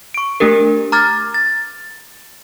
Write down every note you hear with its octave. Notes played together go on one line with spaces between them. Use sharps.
C#6 D7
A3 D4 G4 A#4
A#5 D6 F6 G#6 A6
A6